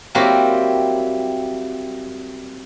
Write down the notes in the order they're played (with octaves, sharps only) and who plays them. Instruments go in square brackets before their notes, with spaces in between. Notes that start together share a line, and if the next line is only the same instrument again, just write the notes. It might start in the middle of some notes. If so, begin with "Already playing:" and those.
[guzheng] F#3 G3 A#3 C4 E4 F#4